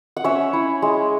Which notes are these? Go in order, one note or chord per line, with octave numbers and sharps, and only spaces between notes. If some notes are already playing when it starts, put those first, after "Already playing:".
F#5
C#4 C#5 E5
E4
G#3